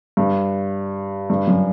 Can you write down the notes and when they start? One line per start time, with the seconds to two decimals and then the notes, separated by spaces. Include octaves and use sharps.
0.17 G2
1.30 G2
1.48 F#2